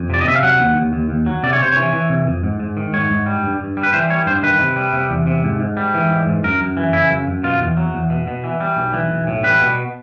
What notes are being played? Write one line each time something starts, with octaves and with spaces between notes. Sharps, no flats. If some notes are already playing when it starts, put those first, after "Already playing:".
Already playing: F2
C3 D5
D#5
C3 E5
F5
F#3 F#5
D#2
D#2
D#2
D#2
F#3
C3 D5
C#5
C3 C5
E3 C#5
E3
C3
F2
G#2
G#2
D#3
G#2 C#5
G#2
G3
G2
G2
G3
B4
E3 C5
G3 C#5
G2 C5
D#3 B4
C3
G3
C3
E2
C3
G#2
G#2
G3
E3
G#2
G#2
F#2 A#4
F#2
E3
C#3 E4
F#2
F#2
B2 F4
E2
F#3
E2
B2
B2
E3
G3
B1
E3
B1
A2
G3 B4
B2